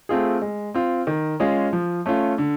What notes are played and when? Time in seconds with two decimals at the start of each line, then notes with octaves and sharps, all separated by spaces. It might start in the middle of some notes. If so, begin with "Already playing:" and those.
0.09 A3 C4 F4 G#4
0.42 G#3
0.74 C4 F4
1.07 D#3
1.40 G#3 C#4 F4 G#4
1.73 F3
2.06 A3 C#4 F4
2.38 D3